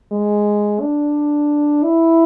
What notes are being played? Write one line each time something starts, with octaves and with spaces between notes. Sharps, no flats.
G#3
D4
E4